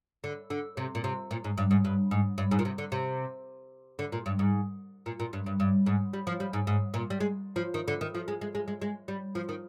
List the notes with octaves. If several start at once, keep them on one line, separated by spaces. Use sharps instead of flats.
D3
D3
C3
A#2
C3
A#2
G#2
G2
G#2
G2
G#2
G2
G#2
A#2
C3
D3
C3
D3
A#2
G2
G#2
A#2
A#2
G2
G2
G2
G#2
G3
F3
G3
G#2
G#2
A#2
G3
G#3
F3
D#3
D3
D#3
F3
G#3
G#3
G#3
G#3
G#3
G3
F3
D#3